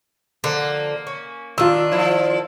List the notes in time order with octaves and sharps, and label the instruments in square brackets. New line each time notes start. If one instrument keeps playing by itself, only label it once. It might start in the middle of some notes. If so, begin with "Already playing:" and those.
[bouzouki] D3 F3 [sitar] A#3
[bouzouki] C#4
[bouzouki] D#3 D4 [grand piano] F4 E6
[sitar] F3 E4